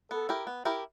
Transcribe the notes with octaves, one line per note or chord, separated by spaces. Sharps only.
B3 A4
E4 G4 A#4
B3
E4 G4 A#4